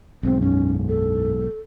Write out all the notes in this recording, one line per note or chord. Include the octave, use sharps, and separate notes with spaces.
B1 G#2 C4
F#2 C#4
A4